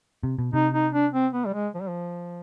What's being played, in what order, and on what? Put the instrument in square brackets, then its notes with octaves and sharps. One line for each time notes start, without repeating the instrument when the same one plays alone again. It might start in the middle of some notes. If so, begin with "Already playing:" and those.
[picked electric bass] C3
B2
[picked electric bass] C3 [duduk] D#4
[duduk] D#4
D4
C4
B3
G3
G#3
F3
G3
F3